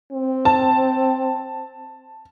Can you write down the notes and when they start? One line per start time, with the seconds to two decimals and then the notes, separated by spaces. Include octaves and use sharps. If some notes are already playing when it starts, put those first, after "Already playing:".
0.12 C4
0.45 A5